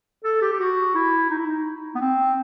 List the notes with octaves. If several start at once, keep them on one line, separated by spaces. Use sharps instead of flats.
A4
G4
G4
F#4
E4
D#4
E4
D#4
B3
C4